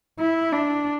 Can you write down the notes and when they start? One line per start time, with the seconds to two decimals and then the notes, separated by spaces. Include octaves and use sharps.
0.19 E4
0.53 D4